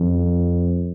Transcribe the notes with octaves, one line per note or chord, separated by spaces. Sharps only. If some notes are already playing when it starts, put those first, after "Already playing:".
Already playing: F2